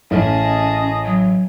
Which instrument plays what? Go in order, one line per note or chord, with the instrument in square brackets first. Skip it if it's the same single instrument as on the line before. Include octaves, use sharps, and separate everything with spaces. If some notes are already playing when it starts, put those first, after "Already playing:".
[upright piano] A1 [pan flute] C#4 [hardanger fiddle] G#4 A5 [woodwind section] D#5
[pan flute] F#3